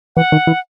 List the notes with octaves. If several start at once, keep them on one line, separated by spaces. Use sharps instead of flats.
E3 F#5
D#3
E3